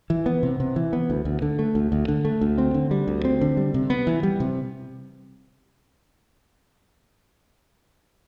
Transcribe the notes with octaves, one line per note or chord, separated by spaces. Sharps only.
E3
B3
C3
C3
E3
B3
D2
D2
D3
A3
D2
D2
D3
A3
D2
C4
D3
G3
D2
C4
D3
G3
C3
B3
E3
G3
C3